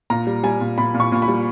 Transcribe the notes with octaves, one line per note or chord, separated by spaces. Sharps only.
A#2 A#5
G3
G3 G#5
A#2
A#2 B5
A#2
C#6
A#2
B5
G3